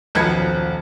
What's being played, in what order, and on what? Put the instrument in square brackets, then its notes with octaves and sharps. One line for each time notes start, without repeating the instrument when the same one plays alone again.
[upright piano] D#1 B1 F3 B4 G#6 C#7